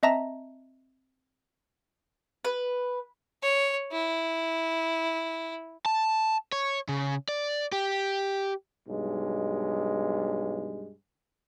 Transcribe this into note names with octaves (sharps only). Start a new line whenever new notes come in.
C4 D#5 E5 A5 A#5 A#6
B4
C#5
E4
A5
C#5
C#3
D5
G4
B1 G2 G#3